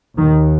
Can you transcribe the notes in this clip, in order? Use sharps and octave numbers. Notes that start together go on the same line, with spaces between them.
D#2 D#3